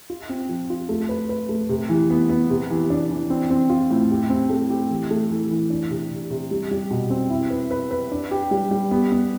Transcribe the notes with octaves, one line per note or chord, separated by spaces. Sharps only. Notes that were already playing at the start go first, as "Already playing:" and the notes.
F4
C4
F3
F4
A3
B4
B4
A3
C3
E3
B3
B3
C3
E3
D4
E3
C4
C4
F4
A2
G4
C4
A3
G4
E3
A3
E3
E3
D4
C3
C3
C3
G3
G3
B2
C4
E4
B4
B4
B4
D4
G4
G3
G3
B3
B3